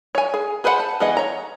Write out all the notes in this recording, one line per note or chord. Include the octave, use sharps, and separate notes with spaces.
C#5 G#5
G#4
G#4 B4 C5 D#5 F#5
A5
E3 B3 G#4 D#5 F#5
C#5 A#5